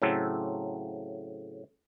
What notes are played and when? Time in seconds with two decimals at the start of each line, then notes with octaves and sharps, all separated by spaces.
0.02 A2 C#3 F#3 C4 A4